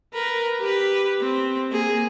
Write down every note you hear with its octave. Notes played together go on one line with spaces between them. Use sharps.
A#4 B4
G4 B4
C4
A#3 G#4